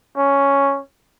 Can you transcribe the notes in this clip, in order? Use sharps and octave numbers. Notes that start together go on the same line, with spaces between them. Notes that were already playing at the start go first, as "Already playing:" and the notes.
C#4